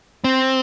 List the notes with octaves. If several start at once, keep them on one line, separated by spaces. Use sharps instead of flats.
C4